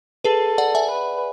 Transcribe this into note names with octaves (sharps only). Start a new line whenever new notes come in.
G#4 A4 B4
D5 F#5
E5 G#5
B4